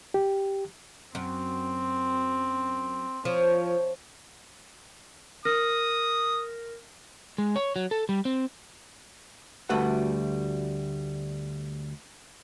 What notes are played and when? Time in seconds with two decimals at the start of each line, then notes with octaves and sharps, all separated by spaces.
0.14 G4
1.15 F#2 C4
3.25 F3 C#5
5.45 A#4 D#6 F6 A#6
7.38 G#3
7.56 C#5
7.76 F#3
7.91 A4
8.09 G3
8.25 C4
9.69 D2 G3 A3 F#4 B4 F#5